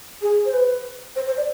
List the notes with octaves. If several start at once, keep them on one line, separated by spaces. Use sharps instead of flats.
G#4
C5
B4
C5
C5
D5